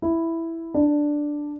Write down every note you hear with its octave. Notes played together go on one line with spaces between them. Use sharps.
E4
D4